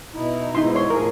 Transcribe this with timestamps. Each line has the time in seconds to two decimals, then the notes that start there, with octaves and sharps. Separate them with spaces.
0.13 B2 D#4 E4
0.55 G#2 B2 D#4 E4 C6
0.75 C#5 C6
0.90 A2 F3 G#4 A#4